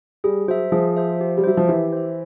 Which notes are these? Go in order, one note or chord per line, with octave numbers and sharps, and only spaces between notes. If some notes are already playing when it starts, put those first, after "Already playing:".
G3 G#4
F#3 C5 E5
F3 G#4
C5 E5
G4
G3
F#3 C5 E5
F3
E3 G4
C5 E5